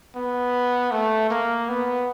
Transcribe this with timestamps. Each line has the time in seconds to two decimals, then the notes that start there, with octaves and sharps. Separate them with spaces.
0.16 B3
0.92 A3
1.30 A#3
1.68 B3